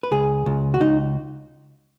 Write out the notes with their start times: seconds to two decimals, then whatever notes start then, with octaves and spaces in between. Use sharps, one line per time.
0.03 B4
0.11 C#2 G#4
0.46 C#2
0.74 F#4
0.80 C#2 D#4